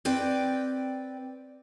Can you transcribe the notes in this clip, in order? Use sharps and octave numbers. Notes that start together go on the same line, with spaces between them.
C4 B4 D5 G5